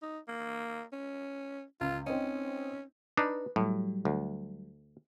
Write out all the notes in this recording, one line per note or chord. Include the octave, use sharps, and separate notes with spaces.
D#4
A#3
C#4
C#2 F4
C4 C#4 D#4 D#5
D4 D#4 B4
A2 F#3 G3
D2